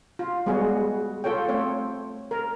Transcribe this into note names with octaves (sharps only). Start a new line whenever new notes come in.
F4
G3 G#3 B3 F#4 G#4
F4 A4 C#5 G5
A3 C4 C5 C#5
A#4